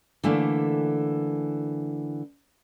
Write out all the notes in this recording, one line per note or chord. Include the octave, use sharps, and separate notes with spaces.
D3 E3 A3 A#3